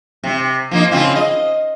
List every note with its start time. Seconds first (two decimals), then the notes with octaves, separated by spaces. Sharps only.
0.24 C3
0.71 F3 A#3 D#4
0.91 C#3 C4 F4
1.15 D#5